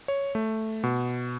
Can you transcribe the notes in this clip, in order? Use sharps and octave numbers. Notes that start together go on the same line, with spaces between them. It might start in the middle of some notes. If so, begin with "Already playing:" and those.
C#5
A3
B2